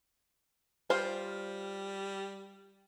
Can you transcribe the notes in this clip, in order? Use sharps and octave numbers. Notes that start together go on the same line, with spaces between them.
G3 F4 C5